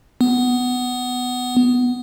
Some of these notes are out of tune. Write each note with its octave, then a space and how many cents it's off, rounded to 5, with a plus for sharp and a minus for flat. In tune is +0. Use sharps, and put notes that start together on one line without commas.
B3 +10